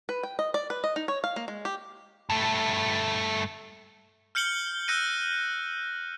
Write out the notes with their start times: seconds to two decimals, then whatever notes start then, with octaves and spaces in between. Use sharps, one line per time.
0.09 B4
0.23 G5
0.39 D#5
0.54 D5
0.70 B4
0.84 D#5
0.96 D#4
1.08 C#5
1.24 F5
1.36 A#3
1.48 G#3
1.65 G4
2.30 G2 A3
4.35 F6 G6 C#7 F#7 G7
4.88 E6 F#6 G6 A#6 C#7 D#7